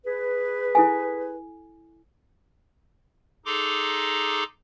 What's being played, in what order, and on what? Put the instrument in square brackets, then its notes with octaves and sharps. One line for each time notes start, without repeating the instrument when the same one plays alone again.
[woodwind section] G#4 B4
[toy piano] E4 A4 G#5
[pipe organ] D#4 G#4 A4 A#5 C6 D6